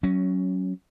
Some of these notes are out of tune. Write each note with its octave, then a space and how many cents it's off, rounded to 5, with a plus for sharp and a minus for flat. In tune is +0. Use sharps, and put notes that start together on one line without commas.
F#3 +15 C#4 +0